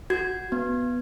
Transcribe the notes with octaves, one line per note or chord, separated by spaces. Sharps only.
F#4 G#6
B3